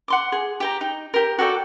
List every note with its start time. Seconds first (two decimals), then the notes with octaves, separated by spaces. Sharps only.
0.08 F#5 C6 D6
0.32 G#4
0.60 G4 G5 A#5
0.81 D#4
1.14 G4 A#4
1.39 F#4 A4 D5 G5